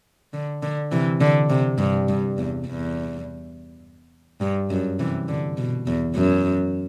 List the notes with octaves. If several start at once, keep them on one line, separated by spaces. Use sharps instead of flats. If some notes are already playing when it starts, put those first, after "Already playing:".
D3
D3
C3 E3
D3
C3
G2
G2
E2
E2
G2
F#2
C3 E3
D3
B2
E2
F#2